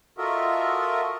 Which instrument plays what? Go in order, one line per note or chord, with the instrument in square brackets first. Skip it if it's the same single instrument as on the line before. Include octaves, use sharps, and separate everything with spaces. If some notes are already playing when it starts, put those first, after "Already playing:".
[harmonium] F4 F#4 A4 A#4 D#5 E5